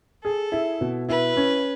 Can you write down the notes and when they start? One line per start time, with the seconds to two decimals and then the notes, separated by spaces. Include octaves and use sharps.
0.24 G#4 A4
0.52 E4
0.81 B2
1.09 E4 B4
1.37 C#4